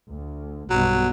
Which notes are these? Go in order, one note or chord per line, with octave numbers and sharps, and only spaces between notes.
D2
B1 G2 B2 F#3